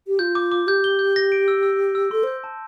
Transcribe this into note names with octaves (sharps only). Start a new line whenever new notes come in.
G4
F4 G6
D6
D6
G4 G6
G7
G6
A#6
D7
E6
E6
E6
E6
A4 C6
C5 G6
A5